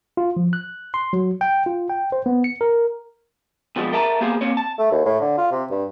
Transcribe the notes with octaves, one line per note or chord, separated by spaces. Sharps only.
F4
F3
F#6
C6
F#3
G5
F4
G5
C5
B3
C#7
A#4
B2 F3 G3 G#3
A4 A#4 E5 A5 A#5
A#3 B3 G4 G#4 C5
A#3 C4 C#5
A5
A3
D#2
A2
D3
F4
C3
G2